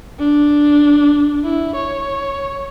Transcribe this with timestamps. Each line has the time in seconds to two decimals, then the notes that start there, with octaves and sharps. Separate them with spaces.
0.20 D4
1.44 E4
1.76 C#5